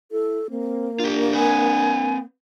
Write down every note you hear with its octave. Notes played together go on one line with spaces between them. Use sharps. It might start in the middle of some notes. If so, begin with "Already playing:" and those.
E4 A4
A#3 C4
D4 F4 G4
C4 B4 G#5